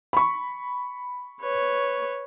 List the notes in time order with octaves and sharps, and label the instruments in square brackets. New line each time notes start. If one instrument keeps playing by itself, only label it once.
[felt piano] B5 C#6
[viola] B4 C#5